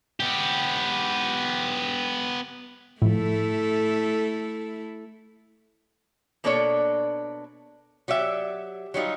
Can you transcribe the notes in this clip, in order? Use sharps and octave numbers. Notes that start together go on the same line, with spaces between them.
B3 G4
A2 F3 A3 E4 A4
B2 A#3 D4 A4 C#5 D5
F#3 G4 D5 E5
F#3 G3 D#4 F4